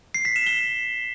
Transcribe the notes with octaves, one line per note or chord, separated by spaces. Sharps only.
C7
B6
E7
G7